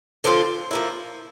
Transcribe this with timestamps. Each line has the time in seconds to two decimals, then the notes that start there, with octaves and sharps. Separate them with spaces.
0.24 D3 F3 C4 F4
0.71 F3 A#3 E4